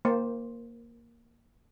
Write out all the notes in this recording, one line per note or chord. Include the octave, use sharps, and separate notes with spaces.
A#3 C5 G5